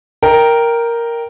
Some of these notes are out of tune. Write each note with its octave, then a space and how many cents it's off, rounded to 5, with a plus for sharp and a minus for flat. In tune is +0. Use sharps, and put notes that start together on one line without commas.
A#4 +0 D#5 +0 G5 +0